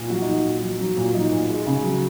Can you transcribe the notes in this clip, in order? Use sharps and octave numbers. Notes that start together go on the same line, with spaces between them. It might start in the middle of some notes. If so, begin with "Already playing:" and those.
Already playing: A#2
F#3 F#4
F#3 D#4
A#2
F#3
F#3
A#2
F#3 D#4
A#2
G#3
C#3
F#3